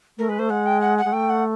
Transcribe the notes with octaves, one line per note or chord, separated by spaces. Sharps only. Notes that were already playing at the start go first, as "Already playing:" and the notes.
A3 A#4
G#3 B4
A3 C5
G#3 F#5
G5
F#5
F#5
G#3
A3 G5
F#5